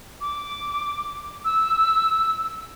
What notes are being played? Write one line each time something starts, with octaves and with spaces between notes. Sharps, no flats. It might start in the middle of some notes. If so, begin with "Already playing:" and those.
D6
E6